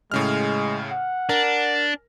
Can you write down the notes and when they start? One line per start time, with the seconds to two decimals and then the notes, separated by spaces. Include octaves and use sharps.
0.12 A2 C#3 G#3 F6
0.92 F#5
1.29 D4 A#4